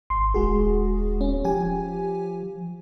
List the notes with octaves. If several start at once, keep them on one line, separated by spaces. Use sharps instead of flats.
G#1 C6
D#1 G#3 F#4 G#4
C#4
F3 G4 G#5